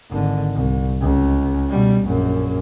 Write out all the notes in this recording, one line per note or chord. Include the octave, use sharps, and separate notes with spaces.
G#1 D3
C2
C#2
B2 G3
A#1 F#2